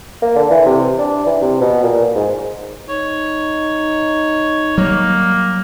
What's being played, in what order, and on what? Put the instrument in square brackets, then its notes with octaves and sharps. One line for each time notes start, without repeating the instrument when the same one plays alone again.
[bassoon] A#3
D3
E3
C3
D4
E3
C3
B2
A#2
G#2
[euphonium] D#4 [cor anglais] C#5
[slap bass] F#3 G3 [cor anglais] A#3